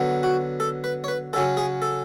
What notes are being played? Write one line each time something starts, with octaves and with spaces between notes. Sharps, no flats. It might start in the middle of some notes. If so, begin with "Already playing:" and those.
Already playing: D3 F#3 B3
F#4
A4
B4
C#5
B4
C#3 F#3 C#4 A4
G#4
A4